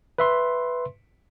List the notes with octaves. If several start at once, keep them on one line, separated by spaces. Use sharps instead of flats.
B4 E5 C6